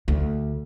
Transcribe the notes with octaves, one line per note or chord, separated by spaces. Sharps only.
D2